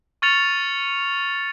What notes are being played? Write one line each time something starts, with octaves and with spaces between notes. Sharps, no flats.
C#6 F6 A6 C#7 F7